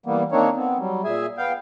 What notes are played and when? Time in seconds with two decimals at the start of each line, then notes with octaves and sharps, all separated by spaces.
0.06 E3 G3 A#3 B3
0.32 D#3 A#3 C4 D4 D#4 C#5
0.56 B3 C4
0.79 F#3 G3
1.04 A#2 G#4 E5 G#5
1.38 B3 F5 G5